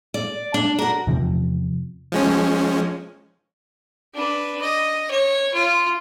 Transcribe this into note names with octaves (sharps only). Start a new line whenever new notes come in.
D5
D4
F#4 A#4
E2 C3 F3
F3 G#3 C#4
D4 B4
D#5
C#5
F4